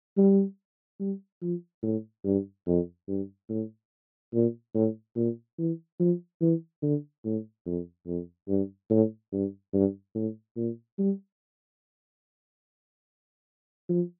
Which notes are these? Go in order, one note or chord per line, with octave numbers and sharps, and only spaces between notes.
G3
G3
F3
A2
G2
F2
G2
A2
A#2
A2
A#2
E3
F3
E3
D3
A2
F2
F2
G2
A2
G2
G2
A2
A#2
G3
F3